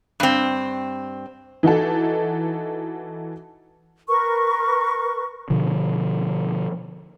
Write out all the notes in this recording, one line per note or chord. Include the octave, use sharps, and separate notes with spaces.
G2 C4
E3 D#4 F#4 A4
A#4 B4 C#6
B2 D3 F3